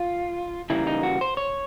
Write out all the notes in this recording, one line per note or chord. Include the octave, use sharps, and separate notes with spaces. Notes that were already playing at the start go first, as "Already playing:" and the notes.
Already playing: F4
C#3 E3 G3 A#3 E4
D#4
F#4
C5
C#5